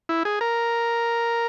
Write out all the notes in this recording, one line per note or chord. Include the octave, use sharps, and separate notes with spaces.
E4
G#4
A#4